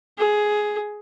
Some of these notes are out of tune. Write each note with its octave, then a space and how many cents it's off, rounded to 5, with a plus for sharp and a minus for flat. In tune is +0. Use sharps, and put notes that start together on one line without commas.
G#4 +10